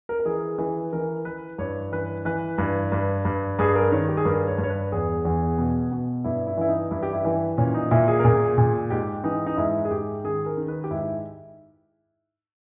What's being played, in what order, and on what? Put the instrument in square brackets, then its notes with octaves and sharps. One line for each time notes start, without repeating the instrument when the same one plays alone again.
[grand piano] A#4
A#4
E3 G#4
E3
E3 A#4
E3 B4
G2 C#5
E3 B4
E3 B4
G2
G2
G2
G2 G#4
A#4
D#3 C#5
G4
G#4
G2 A#4
C#5
G2
C#5
B4
E2 G#4
E2
B2
B2
G2 E4
E4
E3 E4
D#4
G2 E4
G4
E4
E3
A#2 C#4
D#4
A#2 E4
G#4
A#4
A#2 G#4
A#2
G#2 G4
E3 D#4
D#4
G#2 E4
G#4
G#2 G4
D#3 G#4
A#4
D#3
B4
G4
G#2 E4